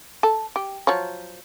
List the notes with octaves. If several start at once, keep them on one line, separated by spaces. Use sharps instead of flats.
A4
G4
F3 F#3 C#5